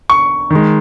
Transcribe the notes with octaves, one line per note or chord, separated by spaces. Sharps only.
C#6
D#3 G#3